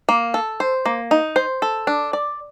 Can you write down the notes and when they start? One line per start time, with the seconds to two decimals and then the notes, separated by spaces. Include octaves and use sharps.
0.09 A#3
0.34 A4
0.60 C5
0.86 A#3
1.11 D#4
1.36 C5
1.62 A4
1.87 D4
2.13 D5